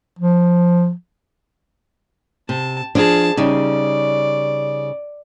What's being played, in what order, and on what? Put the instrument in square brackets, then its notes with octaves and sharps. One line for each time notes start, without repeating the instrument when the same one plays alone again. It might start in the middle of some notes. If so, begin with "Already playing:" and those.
[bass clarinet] F3
[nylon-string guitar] C3 [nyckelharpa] A5
[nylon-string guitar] F3 D4 F4 [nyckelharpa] G#4 A5
[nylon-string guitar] C#3 G3 D#4 [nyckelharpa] D5